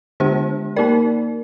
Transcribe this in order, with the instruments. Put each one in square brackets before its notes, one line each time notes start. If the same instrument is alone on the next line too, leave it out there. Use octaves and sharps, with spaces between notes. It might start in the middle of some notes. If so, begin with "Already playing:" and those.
[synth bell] D3 G#3 D4 G4 C5
A#3 D#4 A#4 D5